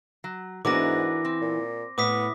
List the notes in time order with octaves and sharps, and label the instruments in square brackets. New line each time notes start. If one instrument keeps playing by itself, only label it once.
[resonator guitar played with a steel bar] F#3
[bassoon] G#2 [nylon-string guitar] E3 B3 [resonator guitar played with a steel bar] D4 F#4 A#4 [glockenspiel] D6 A#6
[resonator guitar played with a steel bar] C4
[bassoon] A#2
[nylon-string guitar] A2 [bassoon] B3 [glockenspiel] D6 D#6 B6